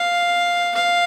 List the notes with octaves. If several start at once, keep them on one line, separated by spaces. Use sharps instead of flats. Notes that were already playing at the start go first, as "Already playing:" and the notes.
Already playing: F5
F5